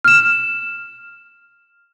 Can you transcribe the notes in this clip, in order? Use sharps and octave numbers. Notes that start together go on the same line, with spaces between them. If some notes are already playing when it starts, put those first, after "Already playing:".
F6 E7